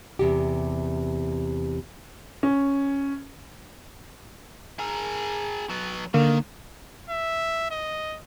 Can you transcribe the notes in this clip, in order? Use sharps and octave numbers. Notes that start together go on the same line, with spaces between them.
E2 C3 G4
C#4
G#4 A#4
F#3 B3
D3 D#3 A#3
E5
D#5